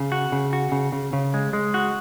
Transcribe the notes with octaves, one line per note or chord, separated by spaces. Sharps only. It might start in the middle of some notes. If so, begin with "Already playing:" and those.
Already playing: C#3
F#4
C#3
F#4
C#3
C#3
C#3
G#3
G#3
F#4